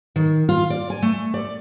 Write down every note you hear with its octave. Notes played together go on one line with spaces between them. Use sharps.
D#3
F4
D5
G#5
A3
D5